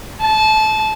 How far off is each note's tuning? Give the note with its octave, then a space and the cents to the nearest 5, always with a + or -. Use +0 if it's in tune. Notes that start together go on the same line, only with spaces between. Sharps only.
A5 -25